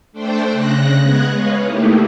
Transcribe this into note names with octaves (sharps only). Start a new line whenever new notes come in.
A3 D4 C5 G5
C#3 F#6 A#6
G#3 B3 F#6 G#6
B4 C#5 D#5 F5
A3 A#3 D#4 E4 G4